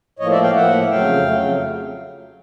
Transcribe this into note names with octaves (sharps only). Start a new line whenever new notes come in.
A2 F3 A#3 C#5 D#5
D5 E5
F5 G5
A2 F3 A#3 E5 F#5
F2 C#3 F#3 A3 F5 G5
F2 C#3 F#3 A3